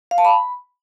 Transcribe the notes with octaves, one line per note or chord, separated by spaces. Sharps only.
F5
A5
B5